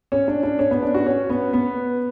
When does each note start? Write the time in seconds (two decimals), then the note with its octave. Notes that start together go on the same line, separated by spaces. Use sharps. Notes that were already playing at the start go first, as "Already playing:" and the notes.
0.12 C#4
0.28 D4
0.43 D4
0.59 C#4
0.71 B3
0.83 D4
0.94 F#4
1.07 C#4
1.29 B3
1.53 B3